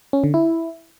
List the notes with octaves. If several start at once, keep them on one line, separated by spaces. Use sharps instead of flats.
C#4
D3
E4